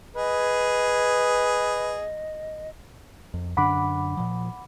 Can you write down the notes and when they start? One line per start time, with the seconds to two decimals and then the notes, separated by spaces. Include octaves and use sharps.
0.16 G#4 B4 D#5
3.34 F2
3.57 F#2 D3 D4 F#5 B5 D6
4.17 A#2 F3